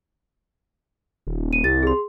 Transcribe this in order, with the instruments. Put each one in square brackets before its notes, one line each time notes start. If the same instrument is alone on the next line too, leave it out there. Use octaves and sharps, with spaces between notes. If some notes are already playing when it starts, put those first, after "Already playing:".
[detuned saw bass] D#1
[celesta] D#7
[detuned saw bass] C2 [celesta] A6
[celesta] G#4 C6